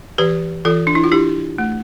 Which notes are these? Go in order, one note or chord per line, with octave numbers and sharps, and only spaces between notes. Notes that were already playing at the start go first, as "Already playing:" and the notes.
E3 G4 B4
E3 F4 A4
D4
E4
F4
D4 E4 G4
A3